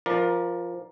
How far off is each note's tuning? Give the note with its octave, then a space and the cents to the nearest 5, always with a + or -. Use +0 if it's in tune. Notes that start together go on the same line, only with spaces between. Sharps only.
F3 +0 A#4 +20 D5 +10